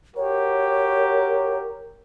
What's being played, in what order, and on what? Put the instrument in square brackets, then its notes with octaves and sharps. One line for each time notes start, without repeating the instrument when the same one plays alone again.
[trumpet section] F#4 G4 [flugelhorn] A#4 [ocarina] C#5